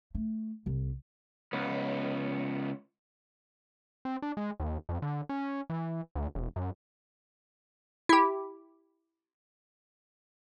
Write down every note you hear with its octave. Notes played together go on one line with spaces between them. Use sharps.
A3
C2
C#2 B3
C4
D4
G#3
D#2
F2
D3
C#4
E3
D2
E1
F#2
E4 G4